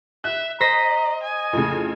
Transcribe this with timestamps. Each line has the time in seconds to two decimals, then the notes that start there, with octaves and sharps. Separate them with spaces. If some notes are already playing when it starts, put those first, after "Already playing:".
0.24 E5 F#6
0.61 C5 D#5 A#5 A#6 B6
1.23 D#5 G#5
1.53 F2 A2 C#3